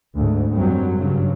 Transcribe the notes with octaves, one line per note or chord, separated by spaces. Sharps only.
D2 G#2
F#2 F#3 G3 C4
G2 C#3 F#3